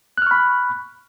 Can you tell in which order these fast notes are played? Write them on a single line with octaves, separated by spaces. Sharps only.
F#6 F6 C#6 B5